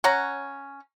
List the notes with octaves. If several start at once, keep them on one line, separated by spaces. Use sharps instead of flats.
C#4 C#5 F#5 A#5